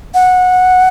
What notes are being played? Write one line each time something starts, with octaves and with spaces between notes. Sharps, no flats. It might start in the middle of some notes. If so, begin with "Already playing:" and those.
F#5